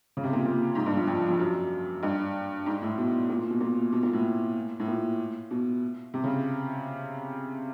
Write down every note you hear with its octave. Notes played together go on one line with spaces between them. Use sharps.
C#3
C3
A#2
A#2
G#2
G2
F2
F2
F2
F#2
G2
G#2
A2
B2
A#2
B2
A#2
B2
A#2
A2
A2
A#2
B2
C3
C#3